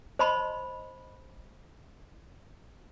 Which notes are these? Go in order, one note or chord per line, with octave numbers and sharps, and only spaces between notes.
C5 D#5 A5 B5 C6